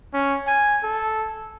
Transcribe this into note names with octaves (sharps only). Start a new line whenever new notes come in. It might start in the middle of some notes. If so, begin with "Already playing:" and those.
C#4
G#5
A4